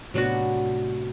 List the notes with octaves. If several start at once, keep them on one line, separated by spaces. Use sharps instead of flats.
A2 C3 F#3 B3 D4 F#4